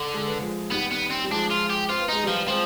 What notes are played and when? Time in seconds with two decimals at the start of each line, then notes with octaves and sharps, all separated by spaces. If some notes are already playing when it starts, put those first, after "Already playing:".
Already playing: D3
0.14 G#3
0.27 B3
0.39 F3 G#3
0.71 D#3 G3 B3
0.92 B3
1.11 C4
1.24 G3
1.30 F3 G#3 D4
1.50 F4
1.70 G4
1.89 C4 F4
2.01 B3
2.08 G#3 D#4
2.24 F3 G3 B3
2.48 F3 G#3 C4